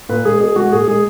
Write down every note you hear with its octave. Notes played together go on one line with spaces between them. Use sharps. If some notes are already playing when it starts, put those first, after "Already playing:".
A#2 B4
G#3 G#4
B2 G#4
G#3 F#4
A#2 G#4
G#3 G#4